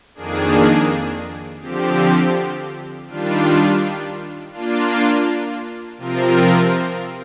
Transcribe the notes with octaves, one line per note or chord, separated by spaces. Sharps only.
F2 D#3 A#3 D4 G#4
D3 F3 C4 G4
D#3 G3 D4 F4
A#3 D4 F4
C3 F3 C4 F4 A#4